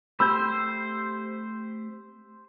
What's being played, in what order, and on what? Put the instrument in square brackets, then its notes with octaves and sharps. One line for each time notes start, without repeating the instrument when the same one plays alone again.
[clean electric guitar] A3 C4 G4 [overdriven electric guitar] C5 [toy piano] B5 [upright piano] E6 G6